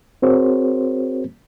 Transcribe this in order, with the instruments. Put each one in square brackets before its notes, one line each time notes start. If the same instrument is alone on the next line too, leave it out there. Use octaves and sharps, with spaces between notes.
[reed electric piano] C4 F#4 G#4 A#4 C5 C#5